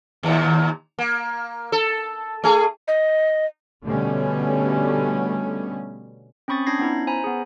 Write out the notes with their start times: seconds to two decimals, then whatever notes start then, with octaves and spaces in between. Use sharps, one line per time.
0.23 D#2 A#2
0.99 A#3
1.72 A4
2.44 A3 G#4
2.88 D#5
3.85 B2 D3 G3 A3 B3 C#4
6.48 C4 C#4 B5 C#6 D#6 A6
6.66 C#4 D4 B5 G#6 A#6 C7
6.79 B3 C#4 D#4 E4
7.07 C5 G#5 A#5 B5
7.24 B3 G#4